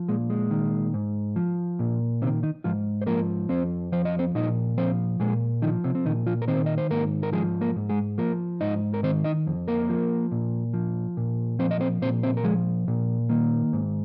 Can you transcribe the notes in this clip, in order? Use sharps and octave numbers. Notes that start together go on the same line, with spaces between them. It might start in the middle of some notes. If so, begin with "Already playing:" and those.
Already playing: F3
A#2 G#3
G#3
D#3
G#2
F3
A#2
C3 D#3 C4
D#3 D#4
G#2 F3 F4
C5
F3 A#3 A#4
F2 C4 C5
F3 C5
D#5
C4 C5
A#2 D#4 D#5
F3 C4 C5
A#2 G#3 G#4
D#3 F3 D#4
C3 C4
C4
A#2 D#3 D#4
F3 F4
A#4
D#3 C4 C5
D#5
C5
G#2 A#3 A#4
A#4
F3 G#3 G#4
A#3 A#4
G#2
G#3 G#4
F3 A#3 A#4
G#2 D#4 D#5
A#4
D#3 C4 C5
D#4 D#5
F2
A#3 A#4
F3
A#2
F3
A#2
F3 C4 C5
D#5
C4 C5
A#2 C4 C5
C4 C5
A#4
F3 G#3 G#4
A#2
D#3 A#3
G#2